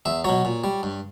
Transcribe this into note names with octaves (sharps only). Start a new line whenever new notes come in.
E2 E5
B2 F#3 C#5
A#2
G3
G2